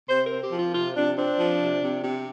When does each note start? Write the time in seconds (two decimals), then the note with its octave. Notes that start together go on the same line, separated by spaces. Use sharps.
0.08 C3 C5
0.25 A#4
0.30 C4
0.41 G4
0.52 F3 F4
0.73 C3 F4
0.95 C3 D4
1.16 C4 D4
1.39 F3
1.60 C3
1.82 C3
2.03 C3